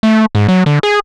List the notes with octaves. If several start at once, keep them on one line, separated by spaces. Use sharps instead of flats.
A3
G#2
F#3
D3
G#4